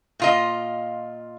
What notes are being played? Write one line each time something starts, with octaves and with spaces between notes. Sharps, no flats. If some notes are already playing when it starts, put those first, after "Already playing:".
A#2 F4 D#5